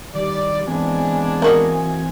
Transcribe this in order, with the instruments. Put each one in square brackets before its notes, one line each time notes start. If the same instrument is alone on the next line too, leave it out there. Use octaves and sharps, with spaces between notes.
[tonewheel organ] D#3 [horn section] G3 D5
[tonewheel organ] E3 C4 G#5 [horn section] G#3 B3 D4
[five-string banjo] A#3 F#4 D#5